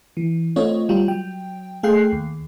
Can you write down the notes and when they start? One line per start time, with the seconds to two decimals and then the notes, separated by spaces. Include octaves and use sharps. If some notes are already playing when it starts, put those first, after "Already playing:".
0.17 E3
0.56 A3 C4 F4 C#5 D#5
0.89 G3 F4 G5
1.08 F#3 G5
1.83 A3 G#4 F5 G5 F#6 C7
2.12 D#2